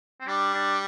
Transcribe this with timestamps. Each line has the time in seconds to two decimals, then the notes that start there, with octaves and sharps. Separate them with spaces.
0.20 C4
0.27 G3 D4
0.54 D4